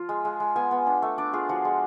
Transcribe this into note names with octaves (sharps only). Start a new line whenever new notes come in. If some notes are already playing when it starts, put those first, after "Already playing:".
Already playing: F3 F4
G#3
G#3
G#3
B3 G#5
B3
D4
A3
D4 D5
F4 G#4
F3 F#4
G#3